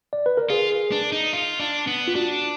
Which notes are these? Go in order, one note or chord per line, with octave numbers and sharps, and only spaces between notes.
D5
B4
A#4
F4 G#4
D4
D#4
F4
D4
B3
F4
D4 F#4